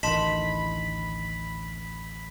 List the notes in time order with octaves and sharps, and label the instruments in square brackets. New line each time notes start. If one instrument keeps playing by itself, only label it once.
[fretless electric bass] A1 D2 D#3 [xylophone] D#5 A5 C6 [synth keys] B5